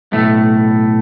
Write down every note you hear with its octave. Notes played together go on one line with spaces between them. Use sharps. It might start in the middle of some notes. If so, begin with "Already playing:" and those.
B1 A2 A3